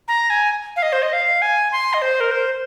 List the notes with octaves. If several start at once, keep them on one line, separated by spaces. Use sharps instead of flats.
A#5
G#5
F5
D#5
C5
D#5
F5
G#5
C6
D#5
C5
A#4
C5